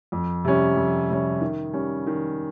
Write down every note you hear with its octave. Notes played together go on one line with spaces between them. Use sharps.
F2
C3 G3 C#4
F2
C3 G3 C#4
D#3
G3 C#4
D#3